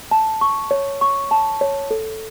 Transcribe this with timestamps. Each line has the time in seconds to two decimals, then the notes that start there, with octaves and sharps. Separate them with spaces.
0.11 A5
0.41 C#6
0.71 C#5
1.01 C#6
1.31 A5
1.61 C#5
1.91 A4